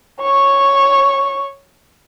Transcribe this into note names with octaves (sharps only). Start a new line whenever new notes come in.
C#5 C#6